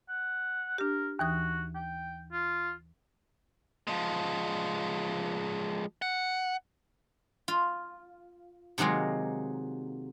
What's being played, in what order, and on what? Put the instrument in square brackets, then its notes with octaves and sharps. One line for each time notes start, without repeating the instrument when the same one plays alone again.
[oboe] F#5
[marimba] D4 G4 [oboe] A#4
[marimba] D#2 E3 D#6 [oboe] F#4
[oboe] G5
F4
[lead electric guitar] F3 G#3
F#5
[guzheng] F4
C3 D#3 F#3 G#3 A#3